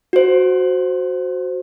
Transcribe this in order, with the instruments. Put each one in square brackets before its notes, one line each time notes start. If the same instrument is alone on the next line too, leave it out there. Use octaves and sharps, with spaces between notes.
[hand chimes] F#4 C5